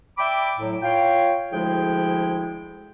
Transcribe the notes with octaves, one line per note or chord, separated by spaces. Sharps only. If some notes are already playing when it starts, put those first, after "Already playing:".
D5 E5 G5 B5 D6
A2 F#3
F4 C#5 F5 G5
D2 F3 G#3 E4 G#4 G5